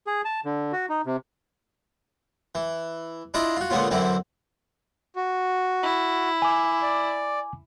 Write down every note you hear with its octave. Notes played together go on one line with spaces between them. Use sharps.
G#4
A5
D3
F#4
D#4
C3
E3
D4 E4 F4 D#5 F5
F4 F#4
A#2 D3 G#3 B3 C#4 F4
F#2 D3 E3 C4 E4
F#4
E4
G#5 D6
D5